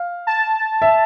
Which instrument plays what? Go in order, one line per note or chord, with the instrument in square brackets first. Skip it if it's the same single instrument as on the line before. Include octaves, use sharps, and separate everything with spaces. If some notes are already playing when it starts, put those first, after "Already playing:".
Already playing: [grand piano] F5
[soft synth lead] A5
[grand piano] E5